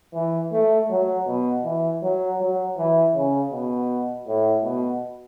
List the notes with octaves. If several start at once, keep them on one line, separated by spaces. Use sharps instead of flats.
E3
A3
F#3
B2
E3
F#3
F#3
E3
C#3
B2
A2
B2